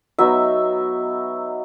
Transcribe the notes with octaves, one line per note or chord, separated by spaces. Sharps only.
F#3 B3 D#4 E5